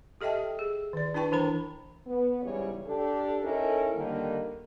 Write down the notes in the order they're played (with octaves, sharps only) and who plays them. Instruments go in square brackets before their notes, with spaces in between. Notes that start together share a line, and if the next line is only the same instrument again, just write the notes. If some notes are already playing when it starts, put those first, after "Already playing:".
[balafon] G4 A4 D#5 E5 G5 A5
G#4
D#3 D5
D4 E4 B4 G5 A5 C#6
E3 D4 A#4 A#5 B5
[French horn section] B3
G#2 C#3 E3 G3 C#5
D4 G4 A4
C#4 D#4 E4 A4 A#4
D3 D#3 G3 A#3